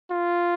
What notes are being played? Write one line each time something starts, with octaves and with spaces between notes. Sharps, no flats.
F4